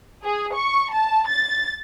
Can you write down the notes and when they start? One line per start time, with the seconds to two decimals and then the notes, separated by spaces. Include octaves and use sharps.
0.24 G#4
0.55 C#6
0.93 A5
1.29 A6